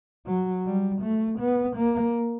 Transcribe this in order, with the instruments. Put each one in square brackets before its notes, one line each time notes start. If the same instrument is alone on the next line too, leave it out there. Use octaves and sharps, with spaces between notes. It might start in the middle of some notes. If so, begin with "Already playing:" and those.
[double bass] F#3
G3
A3
B3
A#3